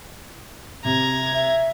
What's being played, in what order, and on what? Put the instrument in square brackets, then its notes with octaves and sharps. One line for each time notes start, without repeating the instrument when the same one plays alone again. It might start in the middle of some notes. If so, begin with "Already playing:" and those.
[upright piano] C3 [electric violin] A#5 G#6
[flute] E5